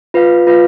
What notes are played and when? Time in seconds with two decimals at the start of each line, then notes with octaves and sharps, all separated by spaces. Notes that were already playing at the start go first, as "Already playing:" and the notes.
0.14 F4 B4 F5
0.47 F4 B4 F5